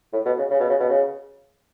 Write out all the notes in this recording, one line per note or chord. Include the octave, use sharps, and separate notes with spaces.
A2
B2
C#3
C#3
B2
C#3
B2
C#3